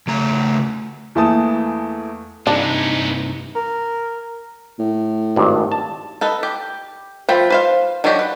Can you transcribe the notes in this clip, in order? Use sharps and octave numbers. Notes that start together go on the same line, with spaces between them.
C#3 A3 A#5
E2 E3 A3 A#3 A5 D#6
G2 C3 G#3 B3 D4 D#4
A#4
A2
G#1 G2
A5
D#4 A4 B4
G4
F3 A3 F4 G5 B5
B4 C5 F5
D#3 F#3 D4 D#4 G4
B4